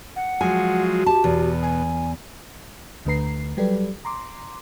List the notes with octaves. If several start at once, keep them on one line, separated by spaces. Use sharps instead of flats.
F#5
F3 F#3 G#3 F#4 G#5
G4 A5
E2 B2
G#5
D2 D3 A3 B4 A#5 C7
F#3 G3 G4 A4 B4 D5
A#5 C6 D6